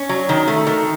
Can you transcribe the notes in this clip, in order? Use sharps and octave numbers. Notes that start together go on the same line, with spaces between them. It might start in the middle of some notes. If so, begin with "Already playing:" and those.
Already playing: C#4
F#3
D#3
A3
D#3